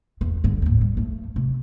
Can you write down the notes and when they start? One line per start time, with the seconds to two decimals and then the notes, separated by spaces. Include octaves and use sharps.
0.21 E2 B3
0.44 G2 D3
0.62 D#2 A2
0.81 G3
0.97 G2 A3
1.36 C3